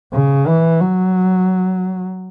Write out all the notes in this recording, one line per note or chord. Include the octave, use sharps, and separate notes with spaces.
C#3
E3
F#3